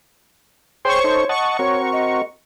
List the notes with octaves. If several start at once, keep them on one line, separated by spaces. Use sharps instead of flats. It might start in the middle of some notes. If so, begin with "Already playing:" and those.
G#4 C5 C#5 G5 C6 C#6
D#4 A4
D#5 F#5 A5 C#6
C4 F#4 A#4 C#5
D#5